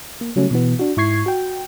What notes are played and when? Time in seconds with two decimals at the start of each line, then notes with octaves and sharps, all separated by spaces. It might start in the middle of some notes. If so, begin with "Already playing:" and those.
0.21 A#3
0.36 C#3 F#3 G3 A3 C#4
0.51 B2 E3 B3
0.79 D4 F#4
0.97 G#2 E4 C#6 G#6 C7
1.26 F#4 G5